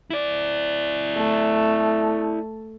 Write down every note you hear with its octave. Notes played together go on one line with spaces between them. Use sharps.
E4 D5
A3